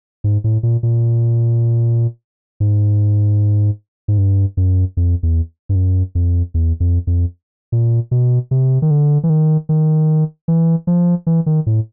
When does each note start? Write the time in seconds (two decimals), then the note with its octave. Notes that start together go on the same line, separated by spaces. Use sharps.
0.24 G#2
0.44 A2
0.63 A#2
0.83 A#2
2.60 G#2
4.08 G#2
4.18 G2
4.57 F#2
4.97 F2
5.23 E2
5.69 G2
5.75 F#2
6.15 F2
6.54 E2
6.80 F2
7.07 F2
7.72 A#2
8.11 B2
8.51 C3
8.82 D#3
8.91 D3
9.24 E3
9.30 D#3
9.69 D#3
10.48 E3
10.87 F3
11.27 E3
11.46 D#3
11.66 A2